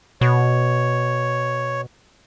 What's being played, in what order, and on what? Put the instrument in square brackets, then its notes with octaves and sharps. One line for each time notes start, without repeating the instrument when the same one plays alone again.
[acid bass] B2 [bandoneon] C#5